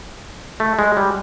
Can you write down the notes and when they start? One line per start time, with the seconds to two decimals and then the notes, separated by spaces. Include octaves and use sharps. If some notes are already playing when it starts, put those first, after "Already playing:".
0.60 A3
0.79 G#3
0.97 G3